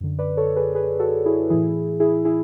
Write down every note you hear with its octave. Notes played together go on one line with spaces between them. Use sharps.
F#2 D3
B4 D5
A4 C#5
G#4 B4
G#4 B4
F#4 A4
E4 G#4
A2 E3 E4 G#4
E4 G#4
E4 G#4